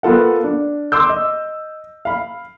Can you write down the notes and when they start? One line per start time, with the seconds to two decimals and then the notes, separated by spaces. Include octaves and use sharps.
0.03 A#3 B3 F4 A4 F#5
0.44 D4
0.92 C6 D6 E6 G6
1.09 D#5
2.05 F5 B5